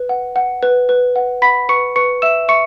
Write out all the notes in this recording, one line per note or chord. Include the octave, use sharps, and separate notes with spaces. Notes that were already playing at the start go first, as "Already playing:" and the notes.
Already playing: B4
F#5
F#5
B4
B4
F#5
F#5 B5 B6
B4 C#6 C#7
B4 C#6 C#7
E5 E6 E7
E5 C#6 C#7